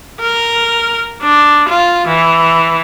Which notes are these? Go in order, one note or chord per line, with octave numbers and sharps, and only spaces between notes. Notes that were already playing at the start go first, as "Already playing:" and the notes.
A#4
D4
F4
E3